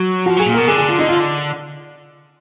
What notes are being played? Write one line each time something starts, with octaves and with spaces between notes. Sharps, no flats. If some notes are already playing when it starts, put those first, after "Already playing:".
Already playing: F#3
F3 F#4
F#3 G#4
A#2
B2 A#4
D3 G#4
G#4
F4
D#4
F4